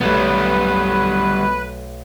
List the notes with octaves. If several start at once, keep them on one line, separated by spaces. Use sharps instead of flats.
B1 G3 A3 B3 B4